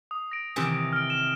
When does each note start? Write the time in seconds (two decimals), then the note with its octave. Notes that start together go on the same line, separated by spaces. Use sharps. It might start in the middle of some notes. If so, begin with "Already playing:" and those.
0.11 D#6
0.31 A#6 D7
0.56 C3 D#3 E3
0.93 F6 D7
1.10 E7